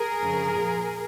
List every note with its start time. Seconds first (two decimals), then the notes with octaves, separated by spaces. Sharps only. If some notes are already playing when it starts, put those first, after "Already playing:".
Already playing: G#4 A#4
0.20 F2 C#3 F3
0.53 A#2 F3